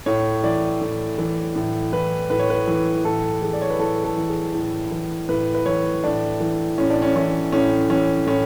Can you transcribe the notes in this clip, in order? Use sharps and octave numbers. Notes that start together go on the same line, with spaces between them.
A2 C#5
E3 D5
A2
E3
A2
E3 B4
A2 B4
C#5
B4
E3
A2 A4
E3 G#4
D5
C#5
B4
A2 A4
A4
E3
G#4
A2 A4
E3
A2 B4
B4
E3 C#5
A2 D4
E3
A2 C#4
D4
C#4
E3 C#4
A2 C#4
E3 C#4
A2 C#4